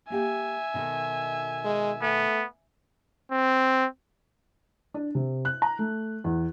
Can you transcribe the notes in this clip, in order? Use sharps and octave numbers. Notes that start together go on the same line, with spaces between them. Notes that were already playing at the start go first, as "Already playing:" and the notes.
A#3 G4 E5 G5 G#5
B2 D#3 A4
G#3
A3 B3
C4
D4
C3
F#6
A#5
A3
E2